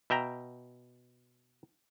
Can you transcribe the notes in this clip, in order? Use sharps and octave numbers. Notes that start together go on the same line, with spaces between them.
B2 E5 G5 A#5